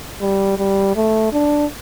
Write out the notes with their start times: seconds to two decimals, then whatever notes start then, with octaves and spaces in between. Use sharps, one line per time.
0.21 G3
0.58 G3
0.96 A3
1.33 D4